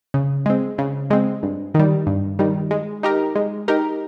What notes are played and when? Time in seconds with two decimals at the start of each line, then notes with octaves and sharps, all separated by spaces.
0.14 C#3
0.46 G#3 C4
0.78 C#3
1.11 G#3 C4
1.43 G2
1.75 D#3 G3
2.07 G2
2.39 D#3 G3
2.71 G#3
3.03 D#4 G4 A#4
3.36 G#3
3.68 D#4 G4 A#4